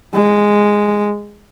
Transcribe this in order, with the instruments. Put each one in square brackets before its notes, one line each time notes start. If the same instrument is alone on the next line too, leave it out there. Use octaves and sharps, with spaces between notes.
[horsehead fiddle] G#3